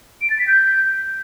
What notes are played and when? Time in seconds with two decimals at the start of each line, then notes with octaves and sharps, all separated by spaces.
0.22 D7
0.30 A6
0.39 B6
0.47 G6